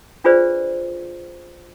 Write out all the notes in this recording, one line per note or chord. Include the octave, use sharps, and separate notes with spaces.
D4 F4 G#4 B4 C5 D5